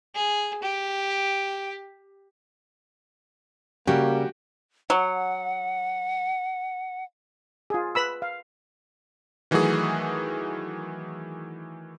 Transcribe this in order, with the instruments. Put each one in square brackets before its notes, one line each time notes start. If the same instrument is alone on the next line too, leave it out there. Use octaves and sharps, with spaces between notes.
[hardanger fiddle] G#4
G4
[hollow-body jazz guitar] C#3 [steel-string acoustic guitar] G3 [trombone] A#3 [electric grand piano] F#4 G4
[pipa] F#3 [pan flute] F#5
[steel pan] F4 G#4
B4 B5 E6
F5
[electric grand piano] D#3 E3 F#3 A3 F#4 G#4